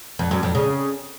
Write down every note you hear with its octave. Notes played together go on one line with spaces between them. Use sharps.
F2
F#2
F2
C#3